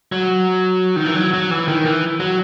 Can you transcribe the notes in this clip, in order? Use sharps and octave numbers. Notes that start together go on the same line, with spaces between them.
F#3
D#3
E3
F#3
F#3
E3
D#3
E3
F#3